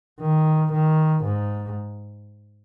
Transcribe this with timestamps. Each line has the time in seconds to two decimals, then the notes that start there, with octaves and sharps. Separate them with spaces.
0.21 D#3
0.73 D#3
1.24 G#2